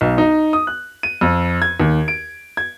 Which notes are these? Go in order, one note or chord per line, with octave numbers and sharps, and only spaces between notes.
B1
D#4
D#6
F#6
D#7
F2
G#6
D#2
D7
G#6